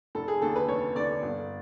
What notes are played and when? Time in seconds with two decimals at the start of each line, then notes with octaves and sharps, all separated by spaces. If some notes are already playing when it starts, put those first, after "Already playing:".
0.15 F1 A4
0.28 G#4
0.41 D#2 D3 A4
0.56 B4
0.68 F1 C#5
0.95 D#2 D3 D5
1.23 G1